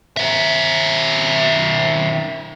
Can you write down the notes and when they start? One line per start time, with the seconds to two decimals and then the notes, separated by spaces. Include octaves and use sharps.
0.17 D#3 E5